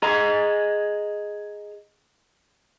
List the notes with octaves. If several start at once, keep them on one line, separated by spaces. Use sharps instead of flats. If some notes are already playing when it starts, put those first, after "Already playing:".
G#4 D#5 A#5